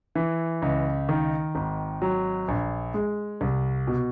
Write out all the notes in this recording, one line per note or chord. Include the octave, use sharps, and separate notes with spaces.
E3
C#2
D#3
G#1
F#3
A#1
G#3
C2
B2